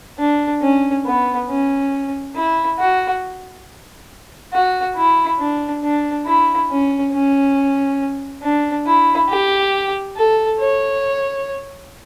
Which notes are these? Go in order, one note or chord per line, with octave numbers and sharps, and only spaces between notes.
D4
C#4
B3
C#4
E4
F#4
F#4
E4
D4
D4
E4
C#4
C#4
D4
E4
G4
A4
C#5